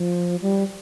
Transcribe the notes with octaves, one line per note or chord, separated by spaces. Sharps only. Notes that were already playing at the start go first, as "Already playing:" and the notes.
Already playing: F3
G3